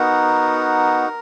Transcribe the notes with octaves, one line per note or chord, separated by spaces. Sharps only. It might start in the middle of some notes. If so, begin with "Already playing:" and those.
Already playing: B3 D#4 F#4 A#4